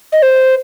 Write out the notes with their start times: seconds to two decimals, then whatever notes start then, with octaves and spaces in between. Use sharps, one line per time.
0.13 D#5
0.22 C5